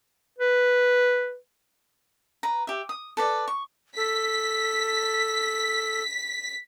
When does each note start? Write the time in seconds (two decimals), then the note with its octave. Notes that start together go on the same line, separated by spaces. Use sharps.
0.39 B4
2.43 B4 A#5
2.67 G4 E5
2.89 D#6
3.17 A4 B4 D5
3.48 C#6
3.97 A4 B6